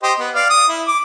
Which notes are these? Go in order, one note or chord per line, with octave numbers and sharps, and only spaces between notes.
G4 C5 D#5
B3
D5 F5
D#6
E4
D6